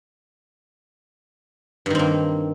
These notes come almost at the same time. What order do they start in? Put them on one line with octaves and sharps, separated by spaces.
G2 D#3 C4 A#3